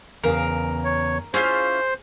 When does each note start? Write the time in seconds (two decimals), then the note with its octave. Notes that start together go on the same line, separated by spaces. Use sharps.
0.24 E2 C#3 A#4 F5
0.85 C#5
1.34 C#4 E4 F4 G#4 C5